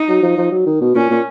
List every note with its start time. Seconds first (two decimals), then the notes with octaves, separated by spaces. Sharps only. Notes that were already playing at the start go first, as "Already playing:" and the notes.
Already playing: D#4
0.08 F#3
0.23 F3
0.38 F3
0.52 F#3
0.66 D#3
0.81 B2
0.95 A#2 C#4
1.10 A#2